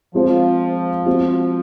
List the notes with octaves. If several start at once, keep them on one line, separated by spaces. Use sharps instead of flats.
F3 G#3 C4 F4 C5
G#3 C4 F#4 C5